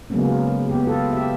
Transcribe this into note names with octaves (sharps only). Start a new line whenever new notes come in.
C#3 F#3 G#3 A#3 B3 C#4
B3 G4
F4 A4
G4 E5